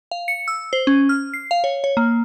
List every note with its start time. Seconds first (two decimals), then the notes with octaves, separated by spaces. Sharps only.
0.11 F5
0.28 C#7
0.48 E6
0.73 C5
0.87 C#4
1.09 F6
1.34 C7
1.51 F5
1.64 C#5
1.84 C#5
1.97 A#3